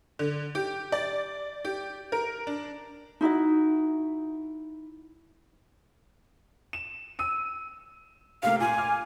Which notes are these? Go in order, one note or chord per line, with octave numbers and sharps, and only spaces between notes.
D3
G4
D5
G4
A#4
D4
D#4 E4 F#4 D#5
E7
E6 D#7
C3 A3 A#3 F5
A#2 G#5
D6 F6